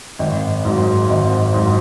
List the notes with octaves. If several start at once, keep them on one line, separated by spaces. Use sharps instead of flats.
G#1
G#2 F#3
G#1
G#2 F#3